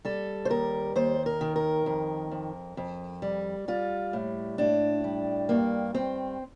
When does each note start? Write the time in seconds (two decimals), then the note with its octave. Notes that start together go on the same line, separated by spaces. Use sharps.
0.05 G3 A4
0.45 C5
0.50 D#2 A#4
0.96 D#2 C5
1.26 A#4
1.41 D#3
1.56 A#4
1.86 F2
2.32 F2
2.77 F2
3.22 G3
3.68 G3 F4
4.13 A2
4.58 A2 D4
5.04 G3
5.49 G2 A#3
5.95 G2 C4